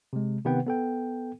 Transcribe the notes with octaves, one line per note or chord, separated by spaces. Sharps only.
C3 G#3
C3 D#3 B3 B4 F#5 G5
B3 A4 G5